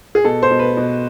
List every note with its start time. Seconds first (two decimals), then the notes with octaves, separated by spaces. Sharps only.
0.15 G#4
0.24 B2 A4
0.43 C5
0.51 B2
0.59 B4
0.77 B2